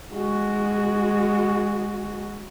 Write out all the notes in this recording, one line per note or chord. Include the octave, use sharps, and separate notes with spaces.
G#3 F#4